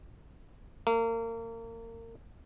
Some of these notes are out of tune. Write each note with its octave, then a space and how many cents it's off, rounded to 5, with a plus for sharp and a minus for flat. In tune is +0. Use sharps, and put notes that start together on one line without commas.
A#3 -30